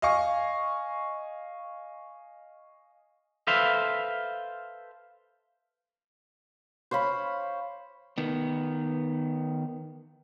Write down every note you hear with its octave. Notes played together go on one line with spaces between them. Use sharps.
D#5 F5 G#5 C#6
A4 B4 C5 E5 F5
C5 C#5 F5 B5
D#3 B3